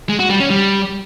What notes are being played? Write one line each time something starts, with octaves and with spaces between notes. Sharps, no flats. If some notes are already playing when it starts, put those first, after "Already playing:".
G#3
F#4
G3
C#4
G3